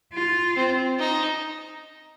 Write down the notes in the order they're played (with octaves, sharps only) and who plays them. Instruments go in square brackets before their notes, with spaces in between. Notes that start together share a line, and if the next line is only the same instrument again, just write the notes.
[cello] F4
[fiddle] C4
D#4